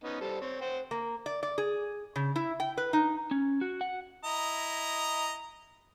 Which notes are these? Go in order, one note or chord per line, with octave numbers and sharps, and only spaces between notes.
B3 C#4 D#4
G3 A4 C5
C4 C#5
C5 F#5 G5
A#3
D5
D5
G#4
C#3
E4
G5
B4
D#4
C#4
F#4
F#5
E4 D#5 A#5